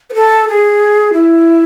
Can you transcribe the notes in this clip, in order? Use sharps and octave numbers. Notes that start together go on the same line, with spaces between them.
B4
A4
G#4
E4